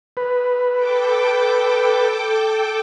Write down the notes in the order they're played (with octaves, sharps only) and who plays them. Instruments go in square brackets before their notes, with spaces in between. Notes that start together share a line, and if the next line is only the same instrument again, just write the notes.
[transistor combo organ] B4
[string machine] A4 G5 D6